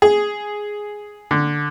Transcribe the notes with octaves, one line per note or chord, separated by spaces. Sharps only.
G#4
D3